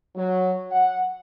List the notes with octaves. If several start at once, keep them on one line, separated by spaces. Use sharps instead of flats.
F#3
F#5